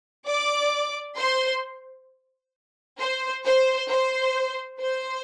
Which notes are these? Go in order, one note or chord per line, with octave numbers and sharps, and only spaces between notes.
D5 D6
C5 C6
C5
C5
C5
C5